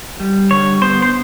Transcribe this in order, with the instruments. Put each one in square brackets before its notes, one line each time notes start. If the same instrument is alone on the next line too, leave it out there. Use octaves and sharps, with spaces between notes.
[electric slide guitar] G3
[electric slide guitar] D3 [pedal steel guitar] C#5
[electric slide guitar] B3 [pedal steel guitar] C5
[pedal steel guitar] C5